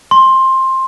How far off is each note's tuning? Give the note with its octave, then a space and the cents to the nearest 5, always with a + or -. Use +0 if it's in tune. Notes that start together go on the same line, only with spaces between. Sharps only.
C6 +15